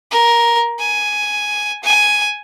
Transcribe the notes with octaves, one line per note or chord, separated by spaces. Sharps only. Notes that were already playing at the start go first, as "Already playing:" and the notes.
A#4
G#5
G#5